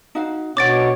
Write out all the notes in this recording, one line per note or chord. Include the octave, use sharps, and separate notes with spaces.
D#4 F#4 F5
B2 D4 C#5 F#5 D6 A6 D7